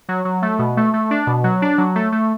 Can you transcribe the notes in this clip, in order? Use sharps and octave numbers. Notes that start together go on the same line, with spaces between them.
F#3
F#3
A3
B2
A3
A3
D4
B2
F#3
D4
F#3
A3
A3